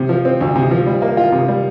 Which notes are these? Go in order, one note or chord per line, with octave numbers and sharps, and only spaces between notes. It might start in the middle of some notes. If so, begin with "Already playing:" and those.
Already playing: C3
F3
C4
D2
C3
F3
G3
A#3
F4
C3
G3